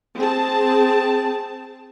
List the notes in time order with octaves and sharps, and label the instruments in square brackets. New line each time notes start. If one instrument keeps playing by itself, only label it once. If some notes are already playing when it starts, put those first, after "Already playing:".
[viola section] C4 G#4 A5